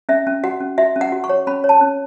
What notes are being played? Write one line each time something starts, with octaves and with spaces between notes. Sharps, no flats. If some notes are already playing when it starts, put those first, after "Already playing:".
C#4 E5
C#4
F#4 F#5
C#4
F#4 E5
C#4
F#5
F#4
C#6
C#5
C#4 B5
C#5
A5
C#4